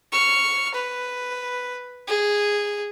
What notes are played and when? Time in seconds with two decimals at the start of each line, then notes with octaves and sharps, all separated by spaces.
0.12 C#6 F6
0.74 B4
2.08 G#4